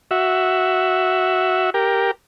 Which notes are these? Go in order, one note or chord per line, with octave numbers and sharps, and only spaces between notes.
F#4 E5
G4 A#4